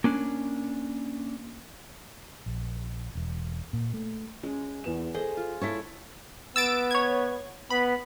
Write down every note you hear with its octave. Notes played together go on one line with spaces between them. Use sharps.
A#3 C#4 D4
A#1
E1
A#2
A3
G#3 C#4
E2 B3 E7
G#4 A4 C5 D#5
F4
G#3 E4 A4 C#5 B6
B3 E6 A6 D7
C#5 G#6
B3 B5